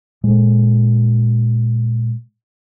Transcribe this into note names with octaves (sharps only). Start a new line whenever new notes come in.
A#2 G#3